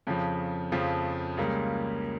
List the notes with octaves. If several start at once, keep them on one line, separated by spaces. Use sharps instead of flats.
F2 C#3 F3
F2 C#3 F3
C#2 C#3 G3 A#3